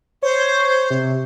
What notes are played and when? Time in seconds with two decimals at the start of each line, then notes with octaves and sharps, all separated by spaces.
0.22 C5 C#5
0.91 C3